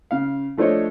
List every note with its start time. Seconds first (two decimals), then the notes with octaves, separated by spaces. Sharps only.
0.11 C#3 F5
0.58 F3 A3 D4 C5 C#5 D#5